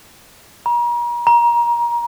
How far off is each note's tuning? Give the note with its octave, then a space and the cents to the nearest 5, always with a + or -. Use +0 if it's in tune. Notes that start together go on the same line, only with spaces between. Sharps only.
A#5 +40
A#5 +25